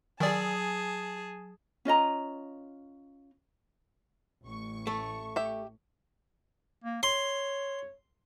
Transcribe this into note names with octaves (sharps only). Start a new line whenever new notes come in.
D#3 F#3 G#4 D5 G#5 A5 D#6
C#4 F4 D#5 A#5
A1 C#6
A3
G4 E5
A#3
C#5 C6